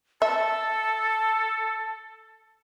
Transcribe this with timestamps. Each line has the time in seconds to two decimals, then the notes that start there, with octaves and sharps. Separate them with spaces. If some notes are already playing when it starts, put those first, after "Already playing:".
0.22 A4 E5 A5